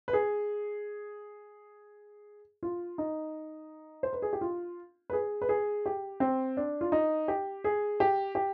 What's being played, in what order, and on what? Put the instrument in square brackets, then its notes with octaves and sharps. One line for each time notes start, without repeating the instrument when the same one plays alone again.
[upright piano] B4
G#4
F4
D#4
C5
B4
G#4
G4
F4
B4
G#4
B4
G#4
G4
C4
D4
F4
D#4
G4
G#4
G4
G4